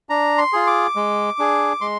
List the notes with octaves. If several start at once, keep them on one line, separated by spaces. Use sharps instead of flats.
D4 A#5
C6
F4 G#4
D6
G#3
D4 G#4
G#3 C6